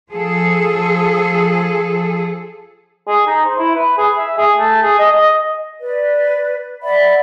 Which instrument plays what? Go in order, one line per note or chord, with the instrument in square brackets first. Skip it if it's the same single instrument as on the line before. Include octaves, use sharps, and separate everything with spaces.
[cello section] F3 G#4 A4
[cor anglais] G#4
D#4
C5
E4
B4
G#4
E5
G#4
A3
G#4
D#5
D#5
[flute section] B4 D5
D5 E5 F#5 B5